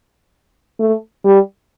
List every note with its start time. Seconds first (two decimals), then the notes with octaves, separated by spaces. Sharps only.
0.80 A3
1.24 G3